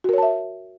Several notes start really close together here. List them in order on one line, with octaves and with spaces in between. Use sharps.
F#4 A#4 C#5 A5 E5